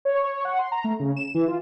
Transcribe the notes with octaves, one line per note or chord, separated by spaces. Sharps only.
C#5
C#5
F#5
C6
A#5
A3
C#3
E7
E3
F4